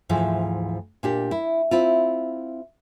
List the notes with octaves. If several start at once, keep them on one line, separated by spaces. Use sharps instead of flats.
D2 G#2 E3 F3
A#2 D4 G4
E4
C4 E4 F4